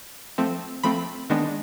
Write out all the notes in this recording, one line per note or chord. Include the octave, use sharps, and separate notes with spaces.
F3 A3 C4
F3 A3 C4 B5
D#3 G#3 B3 D4